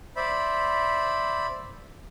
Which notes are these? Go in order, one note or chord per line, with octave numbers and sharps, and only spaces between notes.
C5 D5 E5 B5